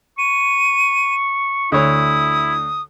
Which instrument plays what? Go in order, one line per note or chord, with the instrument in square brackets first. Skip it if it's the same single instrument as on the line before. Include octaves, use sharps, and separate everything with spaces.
[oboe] C#6 [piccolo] D#7
[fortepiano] D2 C#5 [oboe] E4 [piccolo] D#6